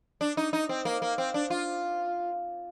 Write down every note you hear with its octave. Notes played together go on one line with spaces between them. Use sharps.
D4
D#4
D#4
C4
A#3
A#3
C4
D4
F4